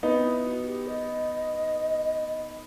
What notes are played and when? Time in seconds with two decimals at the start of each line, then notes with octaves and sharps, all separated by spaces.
0.03 B3 C4 D#4
0.24 E4
0.45 F#4
0.66 G4
0.87 D#5